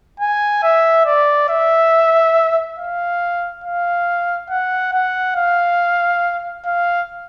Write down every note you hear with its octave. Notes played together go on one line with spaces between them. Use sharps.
G#5
E5
D5
E5
F5
F5
F#5
F#5
F5
F5